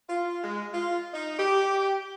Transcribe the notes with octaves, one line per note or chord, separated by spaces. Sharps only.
F4
G#3
F4
D#4
G4